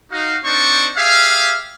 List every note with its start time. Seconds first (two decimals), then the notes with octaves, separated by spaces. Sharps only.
0.11 D#4 F#4 F5
0.45 C4 D4 D#4 C5 D5 C#6
0.97 G4 G#4 E5 F5